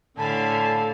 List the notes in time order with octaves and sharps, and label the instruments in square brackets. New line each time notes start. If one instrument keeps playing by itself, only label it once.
[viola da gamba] A2 [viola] D3 [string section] F5 G#5 B5 [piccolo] A5